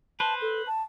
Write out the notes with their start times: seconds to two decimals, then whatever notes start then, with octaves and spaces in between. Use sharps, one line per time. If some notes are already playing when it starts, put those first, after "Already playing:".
0.20 B4 C5 A5
0.42 A4
0.67 A5